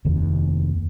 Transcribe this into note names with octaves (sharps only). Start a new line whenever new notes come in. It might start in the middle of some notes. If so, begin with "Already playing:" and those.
F1 D#2